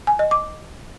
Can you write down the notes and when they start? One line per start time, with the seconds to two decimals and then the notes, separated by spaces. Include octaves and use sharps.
0.07 G#5
0.19 D#5
0.31 D6